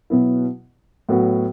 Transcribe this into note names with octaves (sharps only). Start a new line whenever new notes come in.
B2 F#3 B3 E4
A2 F#3 B3 F#4